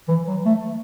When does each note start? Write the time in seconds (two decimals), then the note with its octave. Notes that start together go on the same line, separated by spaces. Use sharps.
0.08 E3
0.27 F#3
0.46 A3